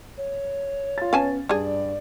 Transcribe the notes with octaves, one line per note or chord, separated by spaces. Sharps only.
C#5
F4 A6
B3 C#4 F5 G#5 A5
G2 D4 G#4 D5